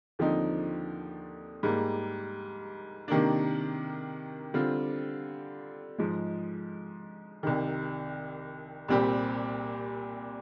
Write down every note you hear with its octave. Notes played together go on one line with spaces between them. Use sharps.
D#2 D3 F3 C4 D#4
G#2 G3 A#3
C3 D#3 A#3 D4
D3 G3 C4 F4
G#2 F3 G#3
C2 C3 D#3
C2 A#2 G3 C4 G4